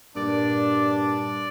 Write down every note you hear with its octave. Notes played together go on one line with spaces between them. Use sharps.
G2 A#2 D4 D5